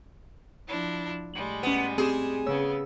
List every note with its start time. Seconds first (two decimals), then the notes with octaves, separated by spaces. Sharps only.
0.67 F3 D4 E4
1.34 A2 G3 G#3 F#7
1.63 B3 C#4 D#7
1.98 C4 G4 G#4 E7
2.46 C#3 B3 C#5 E6